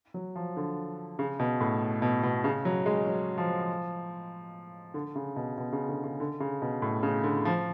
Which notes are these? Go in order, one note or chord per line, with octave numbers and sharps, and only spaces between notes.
F#3
F3
D3
C#3
B2
A2
B2
B2
C#3
F#3
G#3
F#3
F3
D3
C#3
B2
B2
C#3
D3
C#3
D3
C#3
B2
A2
C#3
D3
F3